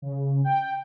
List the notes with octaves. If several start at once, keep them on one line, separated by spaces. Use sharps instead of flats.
C#3
G5